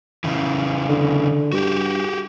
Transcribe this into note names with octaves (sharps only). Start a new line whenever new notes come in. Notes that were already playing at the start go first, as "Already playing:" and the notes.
C#3 E3
D3
G2 F#4 G4